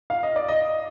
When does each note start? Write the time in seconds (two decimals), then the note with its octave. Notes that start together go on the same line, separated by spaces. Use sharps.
0.10 F5
0.23 D#5
0.36 D5
0.49 D#5